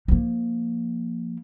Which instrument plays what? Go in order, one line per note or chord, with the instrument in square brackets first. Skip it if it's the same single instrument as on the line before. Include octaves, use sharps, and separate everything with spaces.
[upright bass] F3 A#3